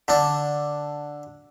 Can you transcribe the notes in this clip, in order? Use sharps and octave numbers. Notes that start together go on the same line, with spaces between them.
D3 D4